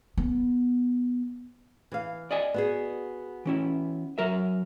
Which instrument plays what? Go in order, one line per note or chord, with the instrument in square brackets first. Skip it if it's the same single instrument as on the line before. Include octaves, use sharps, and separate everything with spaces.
[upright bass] B3
[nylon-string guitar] E3 F5
[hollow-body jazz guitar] D5 D#5 G#5
[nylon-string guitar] B3 F#4 G#4
[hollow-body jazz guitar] E3 C#4 E4
F#3 A#4 E5